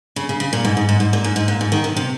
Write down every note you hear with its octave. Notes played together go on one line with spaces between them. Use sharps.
C#3
C#3
C#3
A#2
G#2
G#2
G#2
G#2
A#2
G#2
G#2
A#2
G#2
D#3
C3
C3